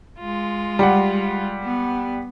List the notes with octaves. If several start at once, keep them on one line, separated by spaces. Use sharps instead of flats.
G#3 F4
G3 F#5
B3